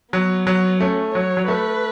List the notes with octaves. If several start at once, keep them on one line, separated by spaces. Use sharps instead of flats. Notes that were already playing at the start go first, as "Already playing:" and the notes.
F#3 B3
F#3
A3 C#4
F#3 C#5
F#3
A3 B4